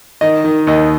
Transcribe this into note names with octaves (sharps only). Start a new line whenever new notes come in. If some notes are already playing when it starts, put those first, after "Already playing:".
D#3 D#5
D#3
D#2 D#5